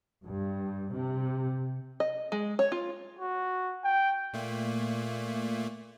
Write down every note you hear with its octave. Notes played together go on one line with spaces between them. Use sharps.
G2
C3
D#5
G#3
C#5
F4
F#4
G5
A#2 A3 A#3